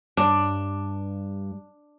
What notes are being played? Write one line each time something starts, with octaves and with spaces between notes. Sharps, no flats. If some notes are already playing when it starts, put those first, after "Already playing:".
G2 D4